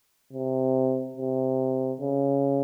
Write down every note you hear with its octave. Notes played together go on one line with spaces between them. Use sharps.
C3
C3
C#3